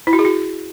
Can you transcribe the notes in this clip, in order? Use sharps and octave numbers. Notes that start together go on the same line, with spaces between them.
E4
F#4
G#4
F#4